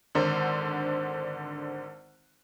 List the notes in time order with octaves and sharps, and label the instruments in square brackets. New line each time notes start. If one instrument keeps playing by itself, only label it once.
[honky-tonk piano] G#1 D3 C5